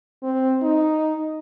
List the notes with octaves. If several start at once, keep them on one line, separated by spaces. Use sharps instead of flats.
C4
D#4